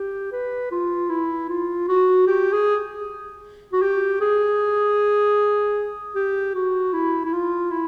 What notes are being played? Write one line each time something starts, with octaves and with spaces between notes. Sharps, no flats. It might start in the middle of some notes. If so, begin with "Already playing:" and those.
Already playing: G4
B4
F4
E4
F4
F#4
G4
G#4
F#4
G4
G#4
G4
F#4
E4
E4
F4
E4